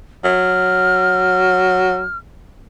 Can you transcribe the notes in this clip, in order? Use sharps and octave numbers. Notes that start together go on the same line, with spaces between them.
F#3 F6